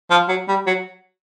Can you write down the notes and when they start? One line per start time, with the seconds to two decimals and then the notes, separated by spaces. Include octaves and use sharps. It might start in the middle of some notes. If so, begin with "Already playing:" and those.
0.11 F3
0.29 F#3
0.49 G3
0.67 F#3